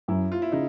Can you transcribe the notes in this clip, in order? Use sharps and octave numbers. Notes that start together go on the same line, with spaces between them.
F#2 E4
F4
E4
C#3 D#4